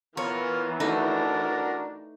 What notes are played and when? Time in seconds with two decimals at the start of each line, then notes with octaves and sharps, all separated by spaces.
0.17 E3 B3 F4 A#4 C#5
0.80 A3 D4 D#4 F#4 A4 A#4